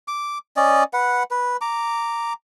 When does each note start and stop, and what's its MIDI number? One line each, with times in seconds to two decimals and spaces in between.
0.08 0.38 86
0.57 0.84 61
0.57 0.84 74
0.57 0.84 75
0.93 1.23 71
0.93 1.23 78
1.31 1.57 71
1.61 2.33 82
1.61 2.33 86